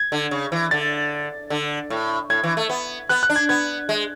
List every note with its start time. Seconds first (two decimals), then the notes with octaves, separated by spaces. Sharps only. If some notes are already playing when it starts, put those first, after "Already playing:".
Already playing: G#6
0.12 D3
0.31 C#3
0.52 E3
0.71 D3 A6
1.50 D3
1.90 A2
2.30 A2 G#6
2.44 E3
2.57 A3
2.69 B3
3.09 B3 F#6
3.23 F#6
3.30 D4
3.36 G#6
3.49 B3 G#6
3.89 G#3